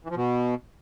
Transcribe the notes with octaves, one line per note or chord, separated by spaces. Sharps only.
E3
F3
B2